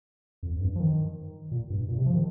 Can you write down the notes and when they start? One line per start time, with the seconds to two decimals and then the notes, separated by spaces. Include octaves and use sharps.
0.43 F2
0.56 F2
0.61 G2
0.76 F3
0.80 D#3
1.52 A#2
1.70 G2
1.88 A#2
1.97 C3
2.06 F3
2.15 D#3